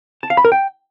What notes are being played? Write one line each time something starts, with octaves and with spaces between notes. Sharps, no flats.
A5
F5
B5
A#4
G5